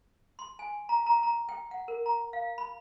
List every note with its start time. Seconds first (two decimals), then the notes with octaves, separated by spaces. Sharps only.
0.39 C6
0.59 G#5
0.89 A#5
1.06 A#5
1.23 A#5
1.49 G5
1.71 F#5
1.88 A#4
2.06 A#5
2.33 F5
2.58 B5